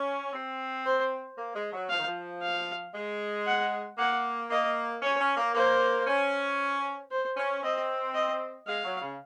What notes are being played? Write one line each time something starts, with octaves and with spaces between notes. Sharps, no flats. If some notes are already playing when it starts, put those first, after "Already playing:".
Already playing: C#4
C4
C5
A#3
G#3
F#3
F3 F5
D#3
F3
F5
G#3
F#5
A#3 F#5
A#3 D#5
C#4 C#5
C#4
A#3
A#3 C5
C#4
C5
C#4
C4 D#5
D#5
G#3 F5
F#3
C#3